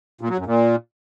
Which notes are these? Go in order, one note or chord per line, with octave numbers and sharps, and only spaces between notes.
A#2
F#3
F#2
A#2